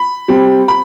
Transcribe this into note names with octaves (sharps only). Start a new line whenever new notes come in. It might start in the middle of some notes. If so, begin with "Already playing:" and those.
Already playing: B5
G3 C4
B5